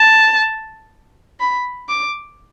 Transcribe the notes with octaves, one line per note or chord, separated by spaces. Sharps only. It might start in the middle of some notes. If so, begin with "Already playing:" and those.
Already playing: A5
B5
D6